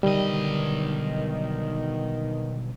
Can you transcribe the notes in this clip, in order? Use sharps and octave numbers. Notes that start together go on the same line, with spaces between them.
B1 D3 D#3 G3 D#5